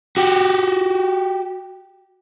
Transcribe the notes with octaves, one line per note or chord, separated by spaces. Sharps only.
F#4 G4